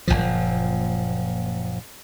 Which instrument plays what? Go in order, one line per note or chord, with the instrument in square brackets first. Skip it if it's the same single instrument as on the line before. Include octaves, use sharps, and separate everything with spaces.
[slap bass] F#1 C2 A#2 F3